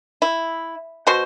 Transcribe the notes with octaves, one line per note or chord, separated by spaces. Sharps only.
E4
B2 F#4 C5 C6